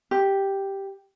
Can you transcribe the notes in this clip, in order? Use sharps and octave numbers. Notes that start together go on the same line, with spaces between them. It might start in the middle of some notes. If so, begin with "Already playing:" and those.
G4